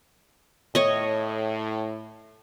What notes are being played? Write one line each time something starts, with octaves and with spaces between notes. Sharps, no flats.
A2 C#5 D#5